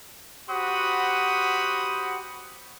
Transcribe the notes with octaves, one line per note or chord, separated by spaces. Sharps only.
F#4 G4 C5 F#5 B5 D#6